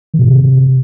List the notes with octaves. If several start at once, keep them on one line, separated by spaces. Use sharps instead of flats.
D#3
B2
A2
C3